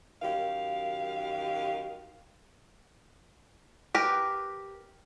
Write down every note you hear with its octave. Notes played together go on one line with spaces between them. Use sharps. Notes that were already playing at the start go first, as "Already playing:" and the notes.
F#2 D#3 G4 F5
G4 A#4 B4